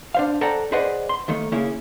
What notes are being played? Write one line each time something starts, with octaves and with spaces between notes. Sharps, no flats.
D4 C5 F5
A4 C5 D5 F#5 G5 A#5
G#4 B4 C5 D5 D#5 F#5
C6
D#2 D#3 A3
C#3 A#3 C#4 E4